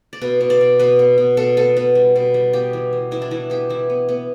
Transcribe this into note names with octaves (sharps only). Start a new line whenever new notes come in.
D5
B2 B4
B2
D5
B2
B2 B4
B3
B2
B2 A4
B3 A4
B2 B4
G3
B2
G3
B3 G4
E3
E3
B3 E4
D4
E3 E4
B3 G4
E3 E4
B3
B3